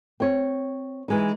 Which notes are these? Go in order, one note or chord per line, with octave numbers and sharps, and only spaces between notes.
C4 C#5
E3 G#3 D#4